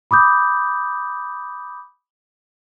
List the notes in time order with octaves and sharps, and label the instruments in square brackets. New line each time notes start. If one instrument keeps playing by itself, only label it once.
[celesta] B5 D6 D#6 G6